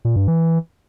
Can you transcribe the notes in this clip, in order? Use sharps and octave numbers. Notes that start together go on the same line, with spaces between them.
A#2
G2
E3